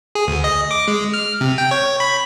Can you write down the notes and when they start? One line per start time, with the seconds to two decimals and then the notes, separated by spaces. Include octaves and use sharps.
0.15 G#4
0.27 D2
0.44 D#5
0.71 D6
0.88 G#3
1.14 F6
1.41 C3
1.58 G5
1.71 C#5
2.00 B5